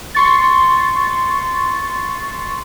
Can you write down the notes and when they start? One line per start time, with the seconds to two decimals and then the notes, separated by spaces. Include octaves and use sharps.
0.15 C6 C#6 A6